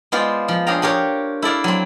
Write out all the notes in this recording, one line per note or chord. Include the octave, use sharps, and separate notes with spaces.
G#3 B3 F4 C5 D5
F3
D4 G#4 C#5 F5 G5 A#5
D4 G4 A#4 C#5
E4 A4 D5 F5
F#3 C4